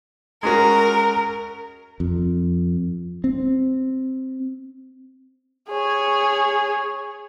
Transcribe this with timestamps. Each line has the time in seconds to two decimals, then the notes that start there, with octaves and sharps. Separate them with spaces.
0.43 G#3 C#4 F#4 A#4
2.00 F2
3.24 C4
5.70 G#4 C#5